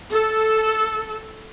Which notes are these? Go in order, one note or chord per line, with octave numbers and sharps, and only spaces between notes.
A4